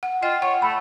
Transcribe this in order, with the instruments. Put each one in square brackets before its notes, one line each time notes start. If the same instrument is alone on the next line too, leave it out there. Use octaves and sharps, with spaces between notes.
[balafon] F#5
[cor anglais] F4 [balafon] D#5 G5
[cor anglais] C#5 [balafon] F#5
[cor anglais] A3 [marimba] B5